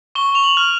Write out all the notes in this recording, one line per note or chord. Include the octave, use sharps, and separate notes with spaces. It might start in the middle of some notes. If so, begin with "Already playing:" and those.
C#6 G7
F7
F#7
F6